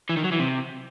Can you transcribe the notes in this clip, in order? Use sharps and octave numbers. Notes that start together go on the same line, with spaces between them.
E3
D#3
F#3
E3
C3